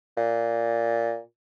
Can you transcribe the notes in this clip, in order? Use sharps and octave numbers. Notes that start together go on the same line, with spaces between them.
A#2